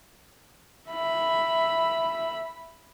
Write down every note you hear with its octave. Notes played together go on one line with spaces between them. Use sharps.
E5 B5